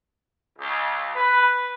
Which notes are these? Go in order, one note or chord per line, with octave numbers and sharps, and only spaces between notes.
C#2
B4